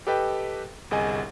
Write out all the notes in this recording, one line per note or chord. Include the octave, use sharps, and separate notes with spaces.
G4 A4 B4 D#5 G5
G1 C2 G#4 D#5 G#5